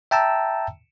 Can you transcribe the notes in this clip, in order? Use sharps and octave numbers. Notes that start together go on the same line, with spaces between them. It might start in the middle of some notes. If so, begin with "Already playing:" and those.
E5 G5 A5 A#5 E6